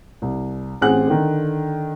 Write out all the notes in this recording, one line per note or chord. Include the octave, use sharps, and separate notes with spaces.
C2
A1 C4 G#4 F#5 F#6
D3 D#3